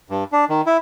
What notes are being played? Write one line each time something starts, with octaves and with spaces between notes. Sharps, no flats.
G2
D4
D#3
E4